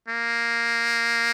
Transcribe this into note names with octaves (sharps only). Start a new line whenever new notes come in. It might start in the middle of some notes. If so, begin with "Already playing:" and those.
A#3